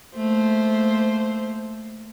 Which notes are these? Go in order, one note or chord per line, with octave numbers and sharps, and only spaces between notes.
A3 A#3 C5